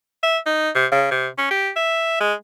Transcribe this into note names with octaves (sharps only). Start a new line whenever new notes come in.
E5
D#4
C3
C#3
C3
C#4
G4
E5
G#3